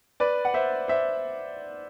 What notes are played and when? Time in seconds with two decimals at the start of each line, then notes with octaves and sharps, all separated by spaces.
0.20 B4 D5
0.45 F#5
0.54 C5 E5
0.88 C5 E5